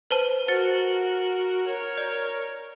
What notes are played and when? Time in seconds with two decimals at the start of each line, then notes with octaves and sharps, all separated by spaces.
0.11 B4 C5 A5
0.48 F#4 A#4 C5 A6 C#7
1.67 A#4 C#5
1.97 D5